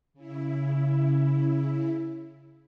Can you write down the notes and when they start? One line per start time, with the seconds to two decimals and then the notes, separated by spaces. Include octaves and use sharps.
0.14 C#3 E4